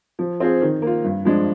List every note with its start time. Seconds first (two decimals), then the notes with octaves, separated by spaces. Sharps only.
0.19 F3
0.40 C4 F4 G#4
0.62 D#3
0.82 A#3 F4
1.04 G2
1.25 F3 G#3 D4